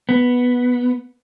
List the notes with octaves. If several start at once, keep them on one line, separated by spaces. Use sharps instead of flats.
B3